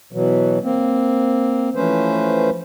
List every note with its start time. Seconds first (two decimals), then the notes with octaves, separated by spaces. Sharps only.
0.13 B2 E3 F#3
0.63 A#3 C4
1.75 E3 F3 A3 C#4 B4 C5